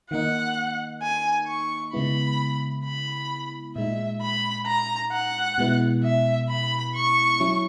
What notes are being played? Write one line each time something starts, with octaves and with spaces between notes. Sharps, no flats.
D#3 A#3 D#4 F#5
G#5
C#6
C#3 G#3 B3 E4 B5
B5
A#2 G#3 D#4 E5
B5
A#5
F#5
B2 G#3 B3 E4
E5
B5
C#6
F#3 C#4 E4